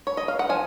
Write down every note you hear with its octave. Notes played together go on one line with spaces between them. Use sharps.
C#5
D#5
F5
F#5
F3 G#5